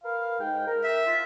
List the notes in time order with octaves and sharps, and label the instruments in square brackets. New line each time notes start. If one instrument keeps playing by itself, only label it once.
[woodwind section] A#4 B4 F5
G#2 G5
A#4
[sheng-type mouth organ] E5
[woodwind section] F4